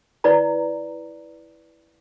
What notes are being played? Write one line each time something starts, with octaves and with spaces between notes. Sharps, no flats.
E4 B4 D5 A#5